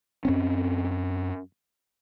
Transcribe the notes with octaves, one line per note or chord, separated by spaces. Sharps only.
F#2 C4 C#4